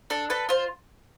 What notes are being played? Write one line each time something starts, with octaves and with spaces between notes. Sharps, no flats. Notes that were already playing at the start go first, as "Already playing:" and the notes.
D4 A4
A4 B4
F4 C5